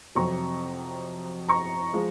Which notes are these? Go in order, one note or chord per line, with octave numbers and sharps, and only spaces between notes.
F2 C3 F#3 A#5 C#6
A#5 C#6
F3 G#3